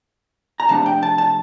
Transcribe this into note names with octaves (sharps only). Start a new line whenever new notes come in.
A#5
C3 F3 A3 D4 A5
G5
A5
A5